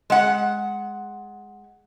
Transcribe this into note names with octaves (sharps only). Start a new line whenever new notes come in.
G#3 F#5